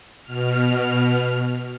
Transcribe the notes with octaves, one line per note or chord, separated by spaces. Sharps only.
B2 F6